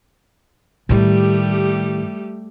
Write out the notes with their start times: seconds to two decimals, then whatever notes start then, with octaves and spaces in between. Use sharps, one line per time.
0.89 A2 D#3 G3 A3 G4